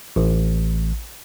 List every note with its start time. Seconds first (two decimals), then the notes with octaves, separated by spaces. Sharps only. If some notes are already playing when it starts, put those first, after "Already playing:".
0.16 A1